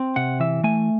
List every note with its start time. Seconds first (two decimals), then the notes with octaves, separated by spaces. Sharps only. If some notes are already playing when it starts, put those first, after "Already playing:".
Already playing: C4
0.16 C3 F#5
0.40 E3 E5
0.64 A3 G#5